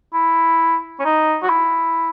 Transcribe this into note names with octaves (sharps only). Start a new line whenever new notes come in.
E4
C#4
D#4
F#4
E4